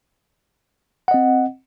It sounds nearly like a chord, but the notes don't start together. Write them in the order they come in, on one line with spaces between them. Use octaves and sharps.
F#5 D#5 C4